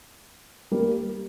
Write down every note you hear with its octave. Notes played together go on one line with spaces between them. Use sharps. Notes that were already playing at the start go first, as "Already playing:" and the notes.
G3 A#3